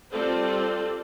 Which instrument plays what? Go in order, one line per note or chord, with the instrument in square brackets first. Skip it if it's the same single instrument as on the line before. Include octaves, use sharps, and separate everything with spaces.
[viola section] G3 C4 F4 A4 C5 D5